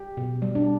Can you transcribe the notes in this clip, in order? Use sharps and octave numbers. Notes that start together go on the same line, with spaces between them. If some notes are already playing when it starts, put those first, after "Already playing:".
Already playing: G4
B2
G3
D4